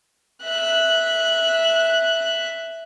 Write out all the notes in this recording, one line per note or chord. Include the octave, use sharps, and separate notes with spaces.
E5 F#6